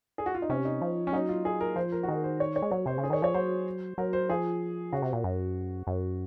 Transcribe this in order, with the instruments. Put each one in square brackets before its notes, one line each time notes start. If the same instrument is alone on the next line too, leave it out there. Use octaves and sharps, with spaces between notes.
[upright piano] G#4
F#4
F4
D#4
[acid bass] C3 [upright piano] C#4
[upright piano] D#4
[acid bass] F3
[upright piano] C#4
[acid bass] F#3 [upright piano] D#4
[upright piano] F4
G#4
A#4
[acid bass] F3 [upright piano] C5
[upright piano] A#4
F#4
[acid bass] D#3 [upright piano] G#4
[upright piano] C5
C#5
C#5
[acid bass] G#3
[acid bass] F#3 [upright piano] C#5
[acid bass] C3 [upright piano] C5
[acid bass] C#3
[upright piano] G#4
[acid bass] D#3 [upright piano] C#5
[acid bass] F3 [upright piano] C#5
[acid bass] F#3 [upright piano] C5
[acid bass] F#3 [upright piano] A#4
[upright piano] C5
[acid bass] F3 [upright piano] G#4
[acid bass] C#3 [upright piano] F#4
[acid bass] C3
A#2
F#2
F#2